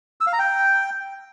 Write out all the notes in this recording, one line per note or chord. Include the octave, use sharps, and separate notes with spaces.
E6
F5
A#5
G5